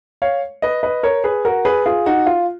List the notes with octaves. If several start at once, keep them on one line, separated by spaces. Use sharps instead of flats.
C#5 F5
B4 D#5
B4 D#5
A#4 C#5
G#4 B4
F#4 A#4
G#4 B4
F4 G#4
D#4 F#4
F4